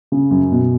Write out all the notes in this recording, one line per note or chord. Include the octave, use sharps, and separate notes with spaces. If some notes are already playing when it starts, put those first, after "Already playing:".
C#3
F#2
B2